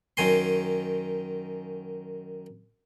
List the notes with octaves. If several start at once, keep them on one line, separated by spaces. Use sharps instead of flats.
F#2 D#3 G#5 C6